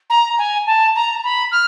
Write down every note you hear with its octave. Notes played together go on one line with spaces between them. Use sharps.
A#5
G#5
A5
A#5
B5
F6